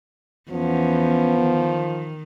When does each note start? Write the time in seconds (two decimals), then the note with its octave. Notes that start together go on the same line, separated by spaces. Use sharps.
0.51 E2 F3 B3 C#4
1.40 D#3